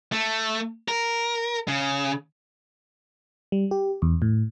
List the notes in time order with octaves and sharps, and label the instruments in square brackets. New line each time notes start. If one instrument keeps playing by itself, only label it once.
[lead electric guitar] A3
A#4
C#3
[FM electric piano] G3
G4
E2
A2